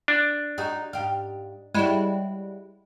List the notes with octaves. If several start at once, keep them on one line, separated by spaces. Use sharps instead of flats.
D4
D#4 F#4 G#4
G#2 G4 F5
G3 G#3 E4 F#4 C#5